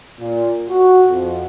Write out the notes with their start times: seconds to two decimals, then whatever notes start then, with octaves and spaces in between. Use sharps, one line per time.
0.19 A#2
0.69 F#4
1.08 F2